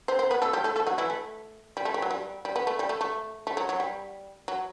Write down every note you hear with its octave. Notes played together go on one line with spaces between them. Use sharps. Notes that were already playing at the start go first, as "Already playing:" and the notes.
C4 C5
C4 C5
B3 B4
A3 A4
G3 G4
A3 A4
A3 A4
F#3 F#4
E3 E4
A3
G3
A3
G3
F#3
G3
G3
B3
A3
G3
A3
A3
A3
F#3
F#3
G3
F#3